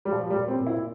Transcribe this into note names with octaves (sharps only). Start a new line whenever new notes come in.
G3
A#2 F3
G3
A#2
C4
A#2
E4